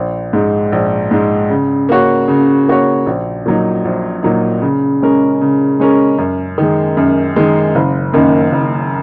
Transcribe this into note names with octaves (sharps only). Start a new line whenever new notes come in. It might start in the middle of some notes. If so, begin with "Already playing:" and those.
Already playing: A#1
G#2 G#3
A#1
G#2 G#3
C#3
A#3 F#4 C#5
C#3
A#3 F#4 C#5
A#1
A#2 F#3 D#4
A#1
A#2 F#3 D#4
C#3
G#3 C#4 A#4
C#3
G#3 C#4 A#4
F#2
D#3 G#3
F#2
D#3 G#3
F#1
F#2 D#3 A#3 D#4
F#1